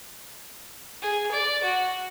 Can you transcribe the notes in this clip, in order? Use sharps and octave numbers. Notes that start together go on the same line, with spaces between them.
G#4
D5
F#4